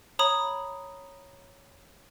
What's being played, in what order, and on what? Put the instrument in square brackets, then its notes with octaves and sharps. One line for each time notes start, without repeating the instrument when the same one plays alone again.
[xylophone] C#5 A#5 B5 D#6